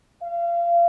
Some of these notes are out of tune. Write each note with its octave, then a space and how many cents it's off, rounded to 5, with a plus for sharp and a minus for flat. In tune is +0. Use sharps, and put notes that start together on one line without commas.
F5 -30